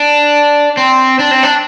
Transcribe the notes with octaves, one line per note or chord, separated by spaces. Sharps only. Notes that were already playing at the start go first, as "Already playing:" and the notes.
Already playing: D4
C4
D4
C4
D4